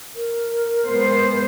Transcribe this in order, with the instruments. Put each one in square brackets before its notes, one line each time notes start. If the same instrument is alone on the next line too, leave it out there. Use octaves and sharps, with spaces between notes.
[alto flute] A#4
[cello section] G#3 B3 C5